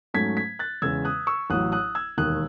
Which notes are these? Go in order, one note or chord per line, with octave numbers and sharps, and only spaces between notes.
G#2 F#3 A3 C#4 G#6 B6
G#6 B6
F#6 A6
E2 C#3 G#3 C#4 E6 G#6
D#6 F#6
C#6 E6
A1 A2 F#3 D#6 F#6
D#6 F#6
E6 G#6
E1 D#2 D#3 D#6 F#6